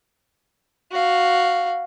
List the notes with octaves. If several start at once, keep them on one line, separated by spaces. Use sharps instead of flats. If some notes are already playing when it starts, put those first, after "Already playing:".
F#4 F5